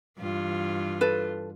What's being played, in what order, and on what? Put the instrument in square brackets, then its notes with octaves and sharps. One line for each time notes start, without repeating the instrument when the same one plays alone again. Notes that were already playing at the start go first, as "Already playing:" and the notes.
[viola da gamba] G2 E3 F4
[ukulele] A4 B4